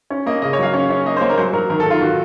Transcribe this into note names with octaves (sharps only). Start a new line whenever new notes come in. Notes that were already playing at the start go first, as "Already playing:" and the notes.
C#4
A#3 D#5
C#3 D#5
C#5
F#3 F5
C#4
C#4
A#3 D#5
C5
A#3 C#5
A#4
F#3 C5
F#3 A#4
D#3 A#4
A4
D#3
F4
D#3 F#4